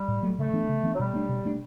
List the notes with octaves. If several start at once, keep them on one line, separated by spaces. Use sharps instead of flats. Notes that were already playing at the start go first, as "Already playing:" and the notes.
Already playing: G3
A2
F#3 A3
C#3 A3
E3 B3 D4
C#3
E3 B3 D4
F#3
B2 G3
A3 D4
B2
A3 D4